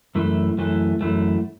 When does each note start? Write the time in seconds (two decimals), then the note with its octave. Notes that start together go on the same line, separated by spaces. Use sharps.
0.15 F#2 E3 A3
0.58 F#2 E3 A3
1.01 F#2 E3 A3